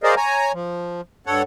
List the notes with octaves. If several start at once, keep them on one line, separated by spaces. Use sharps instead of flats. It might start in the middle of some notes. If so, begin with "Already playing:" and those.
G#4 A#4 C5 D5 D#5 F5
C#5 G#5 A#5
F3
G2 A4 C#5 F#5